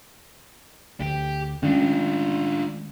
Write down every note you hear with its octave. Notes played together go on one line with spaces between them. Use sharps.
D2 G4
D#3 G#3 A3 C#4 D4 F4